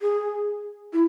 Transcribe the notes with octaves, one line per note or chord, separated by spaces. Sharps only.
G#4
E4